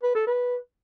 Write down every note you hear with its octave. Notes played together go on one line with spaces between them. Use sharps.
B4
A4
B4